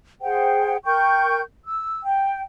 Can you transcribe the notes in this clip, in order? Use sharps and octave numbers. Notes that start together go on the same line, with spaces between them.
G#4 C5 F#5 G5
A#4 G5 C#6 G6
E6
G5